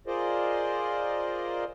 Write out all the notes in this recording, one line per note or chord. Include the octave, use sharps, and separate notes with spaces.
F4 G#4 A#4 C5 D5 D#5